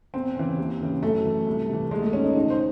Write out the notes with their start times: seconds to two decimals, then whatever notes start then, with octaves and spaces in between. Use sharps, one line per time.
0.14 E2 C4
0.36 C#3 E3
0.58 D#2
0.81 C#3 E3
1.02 F#2 A3
1.25 E3
1.47 C2
1.69 C3 E3
1.91 D#2 G#3
2.02 A3
2.13 D#3 C#4
2.24 D#4
2.35 C#2 D#4
2.50 C5